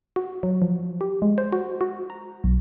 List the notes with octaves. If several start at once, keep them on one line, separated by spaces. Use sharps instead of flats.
F#4
F#3
F3
G4
G#3
C5
F#4
F#4
A#5
B1